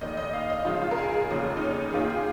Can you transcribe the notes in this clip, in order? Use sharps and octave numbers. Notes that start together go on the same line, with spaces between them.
F1 D#2 D#3 D#5
D#5
F5
D#5
C#2 C#3 F3 F4
F4
A#4
G#4
G#4
F1 D#2 C#3 F3
D#4
C#4
G#4
D#2 D#3 F4
G#4